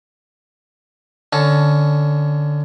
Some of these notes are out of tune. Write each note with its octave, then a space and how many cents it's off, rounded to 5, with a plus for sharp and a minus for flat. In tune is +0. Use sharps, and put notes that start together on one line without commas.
D3 +5 C#4 +15 A4 +0